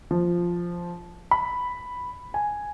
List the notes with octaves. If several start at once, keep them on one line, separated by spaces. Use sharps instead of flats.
F3
B5
G#5